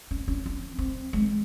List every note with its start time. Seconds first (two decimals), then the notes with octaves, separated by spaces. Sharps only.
0.11 C#4
0.28 C#4
0.46 C4
0.79 C4
1.13 G#3